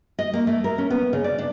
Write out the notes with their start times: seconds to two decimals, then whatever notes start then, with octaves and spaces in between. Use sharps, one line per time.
0.19 D#5
0.33 A#3
0.47 A3
0.64 A#4
0.78 C#4
0.90 B3
1.13 C#3
1.24 D5
1.38 D4